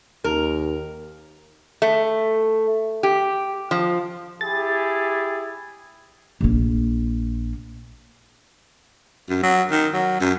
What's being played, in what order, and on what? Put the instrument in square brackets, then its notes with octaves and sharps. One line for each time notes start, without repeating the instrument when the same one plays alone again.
[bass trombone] D#2 [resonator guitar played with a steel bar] A#4
[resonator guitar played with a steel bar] A3
G4
F3
[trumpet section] E4 G4 G#4 [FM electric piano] A6
[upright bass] A#1 A#3
[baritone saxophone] F#2
F#3
D#3
F#3
F#2